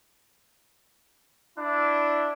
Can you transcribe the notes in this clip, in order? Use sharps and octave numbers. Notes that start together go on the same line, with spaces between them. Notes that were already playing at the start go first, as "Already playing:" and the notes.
D4 E4